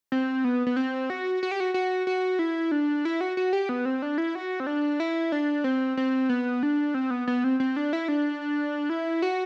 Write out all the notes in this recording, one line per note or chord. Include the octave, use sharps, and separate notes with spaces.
C4
B3
B3
C4
F#4
F#4
G4
F#4
F#4
F#4
E4
D4
E4
F#4
F#4
G4
B3
C4
D4
E4
F#4
C4
D4
E4
D4
C4
C4
B3
D4
C4
B3
B3
C4
C4
D4
E4
D4
E4
F#4